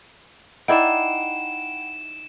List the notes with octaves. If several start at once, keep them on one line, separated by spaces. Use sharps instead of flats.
D#4 E4 D5 F#5 G5 B5 D7 E7